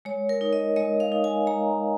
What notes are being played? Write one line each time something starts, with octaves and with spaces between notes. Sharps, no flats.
G#3 C#5
A#4
D#4
D#5
G#3 D#5
F5
D#4
G#5
G#3 A#5